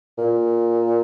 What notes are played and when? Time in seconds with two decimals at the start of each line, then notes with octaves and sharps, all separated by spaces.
0.18 A#2